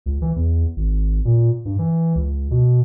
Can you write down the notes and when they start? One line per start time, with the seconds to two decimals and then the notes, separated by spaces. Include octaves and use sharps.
0.06 C#2
0.22 E3
0.36 E2
0.76 G#1
1.25 A#2
1.65 G2
1.79 E3
2.15 C#2
2.51 B2